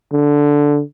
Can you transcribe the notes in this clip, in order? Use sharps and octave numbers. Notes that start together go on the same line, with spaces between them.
D3